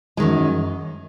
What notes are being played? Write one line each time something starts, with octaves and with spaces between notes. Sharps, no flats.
F#2 D#3 G#3